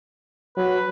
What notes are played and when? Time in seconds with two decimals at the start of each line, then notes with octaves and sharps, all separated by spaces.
0.57 F#3 B4